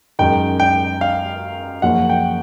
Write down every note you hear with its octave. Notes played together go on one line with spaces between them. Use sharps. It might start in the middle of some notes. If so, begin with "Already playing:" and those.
F#2 D#3 G#3 G5
G5
F5
F#2 C#3 F3 A#3 C#4 F#5
G5